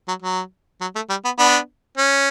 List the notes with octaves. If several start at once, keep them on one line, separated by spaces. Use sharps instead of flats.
F#3
F#3
F#3
A3
G3
B3
B3 D4
C#4